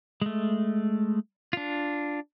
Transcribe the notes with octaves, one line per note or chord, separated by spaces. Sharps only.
G#3 A3
D4 F4